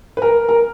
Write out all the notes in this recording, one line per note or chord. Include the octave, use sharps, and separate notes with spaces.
B4
A#4
A#4